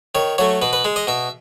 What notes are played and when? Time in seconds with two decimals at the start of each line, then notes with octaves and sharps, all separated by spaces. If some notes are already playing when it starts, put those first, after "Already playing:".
0.15 D#3 C#5
0.38 F#3 A3 C#5
0.62 B2 B4
0.73 B4
0.85 G#3
0.96 D#5
1.07 B2 E5